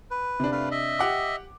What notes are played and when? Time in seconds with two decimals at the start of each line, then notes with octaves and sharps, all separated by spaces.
0.11 B4
0.40 C3 D4
0.52 A3 B4 F5
0.71 D#5 E5
0.99 G4 F#5 D6